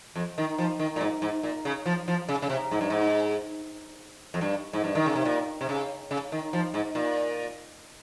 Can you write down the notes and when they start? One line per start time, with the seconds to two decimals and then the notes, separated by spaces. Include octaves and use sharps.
0.16 F2
0.38 D#3
0.58 F3
0.79 D#3
0.96 A#2
1.01 G#2
1.22 G#2
1.43 A#2
1.65 C#3
1.86 F3
2.08 F3
2.29 C#3
2.42 C#3
2.49 C3
2.71 G#2
2.81 G2
2.90 G#2
4.34 F2
4.41 G2
4.73 G#2
4.84 G2
4.95 D#3
5.06 C#3
5.15 C3
5.25 A#2
5.61 C3
5.69 C#3
6.11 C#3
6.32 D#3
6.53 F3
6.74 G#2
6.95 A#2